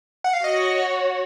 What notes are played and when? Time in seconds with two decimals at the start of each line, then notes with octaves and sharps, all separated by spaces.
0.24 F#5
0.33 F5
0.44 F#4 C#5 D#5 F#5